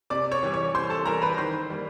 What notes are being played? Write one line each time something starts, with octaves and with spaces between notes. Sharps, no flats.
C3 D5 D6
C#5 C#6
E3 G3
C#5 C#6
C3 C5 C6
A4 A5
E3 G3 A#4 A#5
B4 B5
D#3 C5 C6
G3 A#3